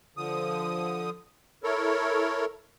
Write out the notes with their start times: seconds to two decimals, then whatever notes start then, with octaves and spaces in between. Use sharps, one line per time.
0.17 D3 F3 D#6
1.63 E4 A4 A#4 C#5